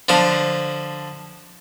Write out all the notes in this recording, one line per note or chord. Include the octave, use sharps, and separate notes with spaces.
D3 F3 F5